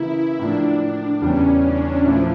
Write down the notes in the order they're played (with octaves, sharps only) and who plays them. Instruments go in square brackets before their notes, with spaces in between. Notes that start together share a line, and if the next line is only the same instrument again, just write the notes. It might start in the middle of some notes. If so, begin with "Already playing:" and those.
Already playing: [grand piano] C#3 E3 A#3 [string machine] E4
[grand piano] A2 F3 A#3 [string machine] D4
[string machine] D4
[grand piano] E2 C#3 G3 [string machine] C#4
[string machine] D4
[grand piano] A#2 A3 E4 [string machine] F3